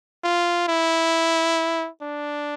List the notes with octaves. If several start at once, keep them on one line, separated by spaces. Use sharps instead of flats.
F4
E4
D4